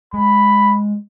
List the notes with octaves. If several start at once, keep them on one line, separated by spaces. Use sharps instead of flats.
G#3 B5